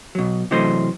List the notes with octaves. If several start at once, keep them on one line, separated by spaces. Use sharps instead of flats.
B2 F#3
C3 E3 F#3 A3 C5 D#5